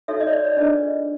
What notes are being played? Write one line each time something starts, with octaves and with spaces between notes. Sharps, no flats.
D#4 F#4 A4 C#5 E5
D#5
C#5
D5
C#5
D4 F4 G#4 B4 D#5